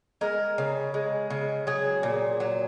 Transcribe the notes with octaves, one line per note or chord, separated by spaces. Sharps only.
G#3 A#4
C#3
G#3
C#3
F#3 G#4
A#2
F#3